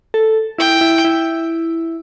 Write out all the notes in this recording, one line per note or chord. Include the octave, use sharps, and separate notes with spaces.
A4
E4 G5
E4
E4